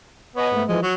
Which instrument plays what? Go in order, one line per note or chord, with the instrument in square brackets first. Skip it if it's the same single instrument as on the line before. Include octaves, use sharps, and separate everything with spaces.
[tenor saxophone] B3 [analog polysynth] C#5 D#5 G#5
[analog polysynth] G#2 A3
[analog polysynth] E3 F3 [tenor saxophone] G#3
[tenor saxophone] F#3 [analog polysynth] C#6